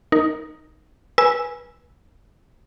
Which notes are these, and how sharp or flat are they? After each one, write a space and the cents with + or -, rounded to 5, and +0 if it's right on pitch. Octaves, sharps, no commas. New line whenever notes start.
D#4 +0 A#4 +0
B4 -25 G#5 +0 E6 +0